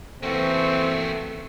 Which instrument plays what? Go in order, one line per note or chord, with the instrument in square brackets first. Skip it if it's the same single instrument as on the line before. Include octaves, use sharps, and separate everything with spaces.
[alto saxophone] E3 [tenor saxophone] A3 [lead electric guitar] A#3 F#4 [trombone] C4